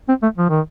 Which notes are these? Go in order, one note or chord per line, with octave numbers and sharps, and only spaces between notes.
C4
A3
F3
D#3